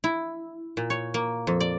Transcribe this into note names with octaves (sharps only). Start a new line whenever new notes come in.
E4
A#2
C#5
A#3
F2
D5